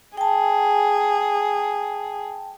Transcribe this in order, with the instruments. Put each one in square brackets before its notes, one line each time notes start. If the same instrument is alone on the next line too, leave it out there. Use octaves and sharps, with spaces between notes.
[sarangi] G#4 [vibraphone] G5 A5